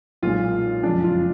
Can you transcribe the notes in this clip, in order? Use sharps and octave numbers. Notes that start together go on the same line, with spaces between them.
B1 A#2 G#3 F4
F#1 F2 F3 G#3 D4
F4